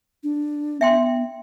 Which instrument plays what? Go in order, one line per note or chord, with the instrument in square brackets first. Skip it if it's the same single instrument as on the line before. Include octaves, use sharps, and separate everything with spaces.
[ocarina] D4
[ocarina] B3 [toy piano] E5 G5 C6